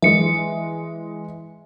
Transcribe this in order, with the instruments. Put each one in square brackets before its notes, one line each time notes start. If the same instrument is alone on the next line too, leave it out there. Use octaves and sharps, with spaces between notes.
[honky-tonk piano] E3 G#3 [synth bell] E5 C#7